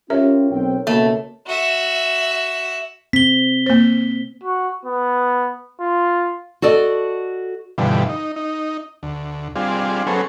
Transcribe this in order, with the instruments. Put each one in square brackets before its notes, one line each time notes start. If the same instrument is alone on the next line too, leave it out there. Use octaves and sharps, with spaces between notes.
[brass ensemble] C#4 F4 G4 [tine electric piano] A#4 C#5 [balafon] E5
[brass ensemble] B1 C4 G5
[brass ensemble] C#2 B2 [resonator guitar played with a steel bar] A3 [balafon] A#3
[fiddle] F#4 E5
[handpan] C4 [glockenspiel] B6 G7
[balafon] A#3 C5
[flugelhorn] F#4
B3
F4
[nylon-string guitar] F#4 A4 D5 D#5
[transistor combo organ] G2 B2 D3 E3 F3 G3
D#4
D#4
D2
G3 C4 D4 F4 G#4
F#3 B3 C#4 G#4 A4 C5